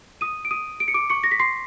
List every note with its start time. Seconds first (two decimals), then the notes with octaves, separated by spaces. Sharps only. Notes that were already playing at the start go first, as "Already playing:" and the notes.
0.21 D#6 D#7
0.45 D7
0.51 D#6 D#7
0.80 D7
0.88 C#7
0.94 D6 D7
1.10 C#6 C#7
1.24 A#6
1.31 B6
1.40 C6 C7